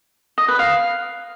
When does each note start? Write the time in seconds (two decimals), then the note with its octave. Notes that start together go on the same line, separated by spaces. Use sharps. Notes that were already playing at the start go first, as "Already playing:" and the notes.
0.38 D#5
0.48 B4
0.59 F5